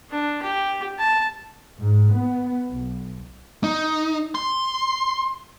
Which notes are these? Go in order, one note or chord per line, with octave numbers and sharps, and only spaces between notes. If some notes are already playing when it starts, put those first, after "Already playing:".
D4
G4
A5
G#2
B3
B1
D#4
C6